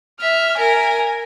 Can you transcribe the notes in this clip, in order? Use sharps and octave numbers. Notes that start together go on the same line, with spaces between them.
E5 F6
A#4 G#5